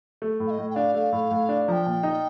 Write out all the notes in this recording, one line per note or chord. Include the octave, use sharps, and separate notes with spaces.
A3
A2
F5
D#5
A2
G5
D4 F5
A3 F5
A2
A2
D4
F3 G5 A#5
A#2
D#4